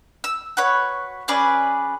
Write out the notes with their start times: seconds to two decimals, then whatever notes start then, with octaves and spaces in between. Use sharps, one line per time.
0.24 E6
0.57 F#4 B4 C#5
1.28 C#4 G#4 B4 D5